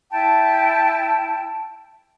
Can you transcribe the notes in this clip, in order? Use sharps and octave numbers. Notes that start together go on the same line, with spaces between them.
E4 G5 A5